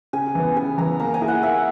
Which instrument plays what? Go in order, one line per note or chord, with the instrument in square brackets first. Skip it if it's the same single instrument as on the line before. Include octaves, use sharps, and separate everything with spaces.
[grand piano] C#3 [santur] G#5
[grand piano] E3 B3
[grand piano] C#3 [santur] G#5
[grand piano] E3 B3 [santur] A#5
[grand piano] A#3 [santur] A#5
[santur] G#5
[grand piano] E4 G#4
[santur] F#5
[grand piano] A#3 [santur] E5